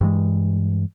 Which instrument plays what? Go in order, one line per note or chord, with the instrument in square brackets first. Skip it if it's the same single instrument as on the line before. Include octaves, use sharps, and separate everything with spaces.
[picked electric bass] G2 E3 G#3